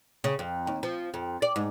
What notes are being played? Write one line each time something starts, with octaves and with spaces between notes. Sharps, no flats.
C#3
F2
D#2
F3
F2
D5
G#2